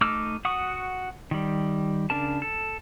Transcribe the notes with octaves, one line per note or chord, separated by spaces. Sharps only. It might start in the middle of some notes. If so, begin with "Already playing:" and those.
A3 D#4 D6 E6 F6
F#4 F#5 C#6 D#6
D#3 G3
C#3 D4 A#4 A5
A4